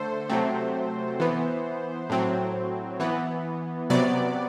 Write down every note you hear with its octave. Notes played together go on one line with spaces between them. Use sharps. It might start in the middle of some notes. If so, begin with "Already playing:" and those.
Already playing: D3 A3 A4 C5
C3 F#3 A3 C4
E3 B3
A2 F#3 C4
E3 B3
C3 F#3 B3 D5